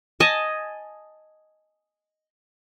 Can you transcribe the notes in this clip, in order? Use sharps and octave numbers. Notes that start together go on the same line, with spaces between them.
D#5 G#5 A5